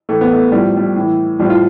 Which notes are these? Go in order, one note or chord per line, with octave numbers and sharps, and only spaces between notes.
A2 E3 A3
B3
A3
A2 F3 G3
G3
A2 E3
A2 F3 G3
F4